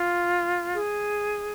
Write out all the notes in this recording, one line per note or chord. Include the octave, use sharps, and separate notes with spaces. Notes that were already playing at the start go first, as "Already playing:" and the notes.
Already playing: F4
G#4